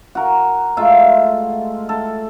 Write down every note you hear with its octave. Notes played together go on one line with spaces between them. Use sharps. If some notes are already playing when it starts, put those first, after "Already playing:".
F#4 A#4
G#3 A3 F4 E5
A4